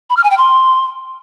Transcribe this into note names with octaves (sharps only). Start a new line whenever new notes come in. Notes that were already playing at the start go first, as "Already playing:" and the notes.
B5
F6
G#5
G5
C6